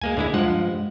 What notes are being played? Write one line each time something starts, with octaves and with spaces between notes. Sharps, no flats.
D2 G#3 A#3 G#5
D#2 D3 G#3 E4
G2 F3 G#3 F#5